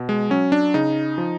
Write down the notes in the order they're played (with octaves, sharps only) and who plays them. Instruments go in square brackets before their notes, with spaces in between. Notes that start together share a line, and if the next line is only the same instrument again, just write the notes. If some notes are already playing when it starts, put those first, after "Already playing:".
Already playing: [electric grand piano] B2
G#3
F#3 C#4
D4
C#3 D#4
F3